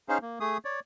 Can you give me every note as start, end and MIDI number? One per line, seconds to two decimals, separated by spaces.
0.09 0.18 61
0.09 0.18 63
0.09 0.18 68
0.09 0.18 72
0.09 0.18 77
0.22 0.39 58
0.40 0.58 57
0.40 0.58 68
0.40 0.58 87
0.65 0.80 73
0.65 0.80 74